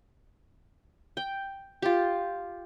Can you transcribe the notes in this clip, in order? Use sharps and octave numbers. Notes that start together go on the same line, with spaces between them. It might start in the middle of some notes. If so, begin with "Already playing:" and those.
G5
F4 G4